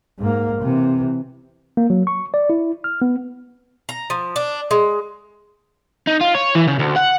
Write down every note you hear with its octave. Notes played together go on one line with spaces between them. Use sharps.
G#2 A#3
C3 E3
A#3
F#3
C#6
D5
E4
F6
B3
A#5
F3
D4
G#3
D#4
F4
C#5
E3
C#3
D2
F#5